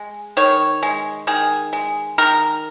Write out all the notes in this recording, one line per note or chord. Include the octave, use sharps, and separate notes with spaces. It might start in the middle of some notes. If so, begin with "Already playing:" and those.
Already playing: G#3
D#3 C#5
G#3
D#3 G#4
G#3
D#3 A#4